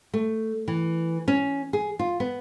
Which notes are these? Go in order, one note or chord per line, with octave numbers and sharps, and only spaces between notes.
A3
E3
C#4
G#4
F4
B3